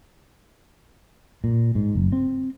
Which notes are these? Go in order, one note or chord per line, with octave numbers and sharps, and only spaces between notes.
A#2
G#2
F#1
C4